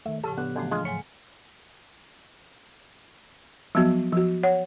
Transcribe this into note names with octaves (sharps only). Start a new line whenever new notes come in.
D#3 A3 E5
A2 C#3 F3 G4 A4 A5
D3 B3 G4 F#6
F#2 D3 E3 F3 A3
F3 G#3 D4 F4 C6 F6
G#2 F#3 C#5 G#5 C#7
F3 F#3 B3 F#4
F3 F#4
C#5 F#5